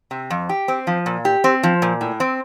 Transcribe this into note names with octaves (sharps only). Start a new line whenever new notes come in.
C3
F2
G4
C4
F3
A#2
G4
C4
F3
A#2
A2
C4